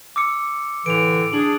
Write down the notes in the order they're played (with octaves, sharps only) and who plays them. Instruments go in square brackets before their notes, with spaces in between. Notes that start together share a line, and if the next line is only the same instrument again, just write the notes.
[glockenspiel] D6 E6 C#7
[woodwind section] A2 D3 E3 [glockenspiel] D7 F7
[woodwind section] D4 G#4 [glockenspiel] F#7